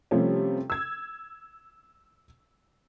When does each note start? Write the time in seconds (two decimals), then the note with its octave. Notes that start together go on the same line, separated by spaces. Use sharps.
0.11 C3 F3 G3 A3 C#4
0.70 E6 G#6